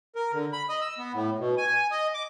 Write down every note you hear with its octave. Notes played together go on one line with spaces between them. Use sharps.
A#4
D3
B5
D#5
E6
B3
A2
B2
G#5
D#5
D6